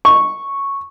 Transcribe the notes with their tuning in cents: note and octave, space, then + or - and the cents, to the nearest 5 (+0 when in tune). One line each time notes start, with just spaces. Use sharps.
C#6 -5